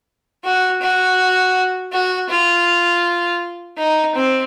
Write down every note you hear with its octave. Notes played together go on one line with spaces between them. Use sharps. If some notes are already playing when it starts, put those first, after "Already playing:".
F#4
F#4
F#4
F4
D#4
C4